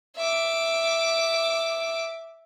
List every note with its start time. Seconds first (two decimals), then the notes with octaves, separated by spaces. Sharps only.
0.16 E5 D6